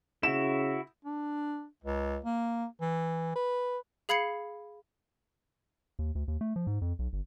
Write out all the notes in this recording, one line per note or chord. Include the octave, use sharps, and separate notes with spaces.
C#3 E4 F#4 E7
D4
C#2
A#3
E3
B4
G#4 F5 B5 G#6 C7 C#7
D#2
D2
D#2
A3
F3
G#2
F2
B1
G1